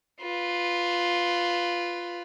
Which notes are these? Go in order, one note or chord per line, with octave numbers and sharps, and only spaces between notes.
F4 B4